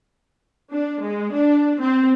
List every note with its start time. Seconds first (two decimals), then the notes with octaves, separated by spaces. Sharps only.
0.71 D4
1.04 G#3
1.32 D4
1.80 C4